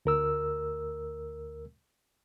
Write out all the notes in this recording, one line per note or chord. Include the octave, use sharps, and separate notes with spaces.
D2 A#4 E6